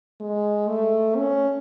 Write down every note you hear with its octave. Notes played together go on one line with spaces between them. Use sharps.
G#3
A3
C#4